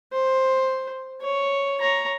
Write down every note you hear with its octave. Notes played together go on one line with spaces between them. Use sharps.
C5
C#5
C#5 A#5